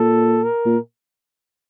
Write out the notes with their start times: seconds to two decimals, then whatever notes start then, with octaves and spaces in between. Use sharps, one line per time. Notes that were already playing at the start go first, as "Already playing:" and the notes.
Already playing: A#2 A4
0.43 A#4
0.66 A#2